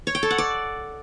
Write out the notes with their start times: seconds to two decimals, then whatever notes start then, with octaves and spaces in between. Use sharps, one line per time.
0.07 C#5
0.15 G5
0.23 A4
0.31 F#5
0.38 D5